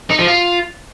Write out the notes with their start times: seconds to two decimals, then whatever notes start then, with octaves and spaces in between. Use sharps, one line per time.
0.10 D#4
0.19 F3
0.27 F4